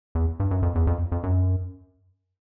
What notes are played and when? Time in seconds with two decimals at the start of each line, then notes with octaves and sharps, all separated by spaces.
0.15 E2
0.40 G2
0.51 F#2
0.63 F2
0.75 E2
0.87 F2
1.12 F2
1.23 F#2